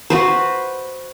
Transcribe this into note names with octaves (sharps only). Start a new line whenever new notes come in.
F#4 B4 C5